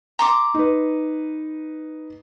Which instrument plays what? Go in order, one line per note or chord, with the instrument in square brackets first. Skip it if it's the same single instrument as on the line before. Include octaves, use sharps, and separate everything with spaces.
[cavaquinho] A#5 C6 D6
[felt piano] D#4 B4